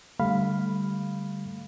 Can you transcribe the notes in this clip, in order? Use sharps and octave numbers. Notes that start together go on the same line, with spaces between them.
D3 G3 A3 F5 B5